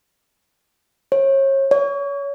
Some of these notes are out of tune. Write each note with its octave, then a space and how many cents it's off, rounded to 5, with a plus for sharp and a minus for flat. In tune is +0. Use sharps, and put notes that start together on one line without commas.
C#5 -35
C#5 +30